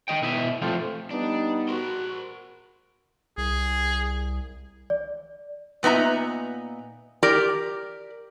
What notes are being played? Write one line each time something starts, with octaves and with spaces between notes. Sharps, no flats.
D#3 F#3 D#5 G5
B2 E4 D#5 E5
F3 A3 C4 F4
G3 B3 D4 D#4
F#4 A#4 C5
C2 G#4
D5
A#2 B3 D#4 E5 A#5
G4 A#4 D5